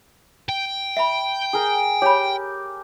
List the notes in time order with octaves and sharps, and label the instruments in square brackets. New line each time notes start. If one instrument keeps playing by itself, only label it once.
[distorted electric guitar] G5
[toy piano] E5 B5
[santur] G#4 A#4
[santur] G4 [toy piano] C#5 B5